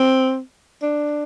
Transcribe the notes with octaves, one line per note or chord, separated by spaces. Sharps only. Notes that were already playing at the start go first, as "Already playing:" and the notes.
Already playing: C4
D4